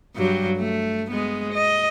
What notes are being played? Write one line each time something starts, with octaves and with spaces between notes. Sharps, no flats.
G2 F#3 G3
A3
G#3 B3
D#5